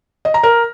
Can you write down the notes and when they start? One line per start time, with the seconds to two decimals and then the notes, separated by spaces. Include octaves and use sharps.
0.25 D#5
0.34 A#5
0.43 A#4